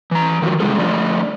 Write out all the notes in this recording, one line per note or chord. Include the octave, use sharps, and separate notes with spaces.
E3 A#5
D#3 F3 F#3
C3 G3 G#3 F4 G#4 A4
D3 F3 A3 D5